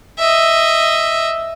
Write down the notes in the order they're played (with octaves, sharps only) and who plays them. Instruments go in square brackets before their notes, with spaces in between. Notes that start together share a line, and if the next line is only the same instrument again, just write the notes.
[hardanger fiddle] D#5 E5